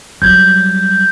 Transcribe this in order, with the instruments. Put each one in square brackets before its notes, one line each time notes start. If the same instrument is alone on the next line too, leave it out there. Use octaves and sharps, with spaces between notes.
[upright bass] F#3 G3 [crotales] G6 G#6